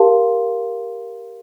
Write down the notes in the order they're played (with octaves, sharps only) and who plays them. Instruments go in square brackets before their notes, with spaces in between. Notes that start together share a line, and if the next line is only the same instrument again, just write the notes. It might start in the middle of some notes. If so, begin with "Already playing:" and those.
Already playing: [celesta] G4 A#4 F5 A5 C6